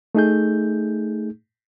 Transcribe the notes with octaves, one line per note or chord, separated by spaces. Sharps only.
A3 D#4 G#4 G6